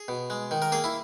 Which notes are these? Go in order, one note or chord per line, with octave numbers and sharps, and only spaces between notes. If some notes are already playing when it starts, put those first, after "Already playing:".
Already playing: G#4
B2
G#3
D#3
A#4
A#3 G#4
E4